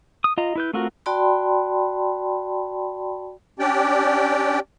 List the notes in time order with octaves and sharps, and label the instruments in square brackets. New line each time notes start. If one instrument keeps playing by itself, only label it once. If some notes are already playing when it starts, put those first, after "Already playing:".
[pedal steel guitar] D#6
F4 D#5 A#5
E4 B4 G6
A3 C4 F4 F#4 A#4
[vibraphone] F#4 D5 G5 A5 B5 C6
[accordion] C#4 D4 G4 D5 G5